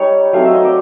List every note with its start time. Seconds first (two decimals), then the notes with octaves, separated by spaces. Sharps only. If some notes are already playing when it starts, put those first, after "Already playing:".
Already playing: G3 D#4 C#5
0.33 F#3 A3 C4 D#4 F5
0.45 E5
0.54 D#5
0.65 D5